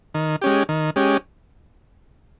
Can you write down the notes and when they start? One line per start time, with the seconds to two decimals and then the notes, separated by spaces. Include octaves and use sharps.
0.14 D#3
0.42 G#3 C#4 G4
0.69 D#3
0.96 G#3 C#4 G4